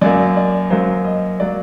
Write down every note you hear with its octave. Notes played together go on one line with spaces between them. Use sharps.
F#2 F#3 A#3 D5
D5
F#2 F#3 A#3 C5
D#5
F#3 A#3 D5